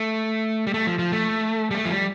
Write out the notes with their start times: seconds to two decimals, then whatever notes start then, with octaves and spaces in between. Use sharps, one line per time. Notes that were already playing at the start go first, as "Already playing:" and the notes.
Already playing: A3
0.67 G3
0.74 A3
0.87 F3
0.99 F3
1.12 A3
1.71 G3
1.75 A3
1.85 F3
1.91 G3